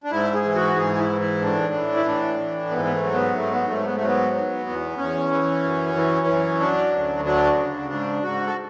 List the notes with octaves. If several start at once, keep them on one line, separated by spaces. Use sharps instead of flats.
D4
G#2 E4
G#4
E3
F#4
G#2 G#4
E4
E3
E4
A2 D4
E3
E4
A2 D4
E3
G#2 B3
B3
A3
F#3
B3
G#2 A3
B3
G#2 A3
B3
A3
F#3
B3
F#3
E2 B3
E2 C#4
E3
F#2
E3
F#2
F#3 D4
D2
F#3 D4
C#3
G#2 D4
G#2 F#4
A4